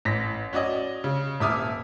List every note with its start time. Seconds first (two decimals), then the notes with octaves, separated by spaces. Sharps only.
0.05 A1 A#6 B6
0.53 C#4 F#4 D5 D#5
1.04 C#3
1.40 D#1 E5 D6 D#6 F6